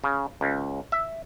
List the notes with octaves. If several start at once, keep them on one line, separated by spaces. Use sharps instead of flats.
C#3
C#2
E5